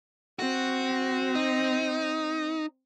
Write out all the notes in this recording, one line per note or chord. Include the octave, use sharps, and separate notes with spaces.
C4 F#4
D#4